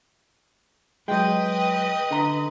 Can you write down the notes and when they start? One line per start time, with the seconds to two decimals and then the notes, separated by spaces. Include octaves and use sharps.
1.08 F#3 G#3 B4 D#5 G5
2.11 D3 A#5